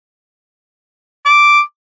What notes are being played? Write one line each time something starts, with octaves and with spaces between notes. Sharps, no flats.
D6